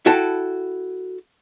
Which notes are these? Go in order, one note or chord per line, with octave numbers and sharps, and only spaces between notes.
E4 F#4 A4 G5 A5